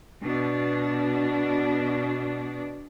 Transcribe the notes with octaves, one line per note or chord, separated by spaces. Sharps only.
B2 D4